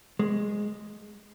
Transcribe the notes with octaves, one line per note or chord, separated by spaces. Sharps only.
G#3